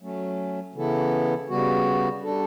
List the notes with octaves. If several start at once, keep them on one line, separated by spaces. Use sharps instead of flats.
F#3 A3 C#4
C#3 E3 B3 E4 A4
C#3 G3 B3 F#4
G3 D4 A4